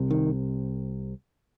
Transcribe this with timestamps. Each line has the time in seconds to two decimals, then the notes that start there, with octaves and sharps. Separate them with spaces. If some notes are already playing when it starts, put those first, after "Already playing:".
Already playing: C2 C3
0.11 D#3